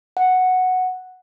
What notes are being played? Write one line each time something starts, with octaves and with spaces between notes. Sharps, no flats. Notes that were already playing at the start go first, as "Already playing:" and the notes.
F#5